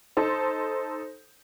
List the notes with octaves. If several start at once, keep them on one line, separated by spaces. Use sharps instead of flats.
D#4 A4 C5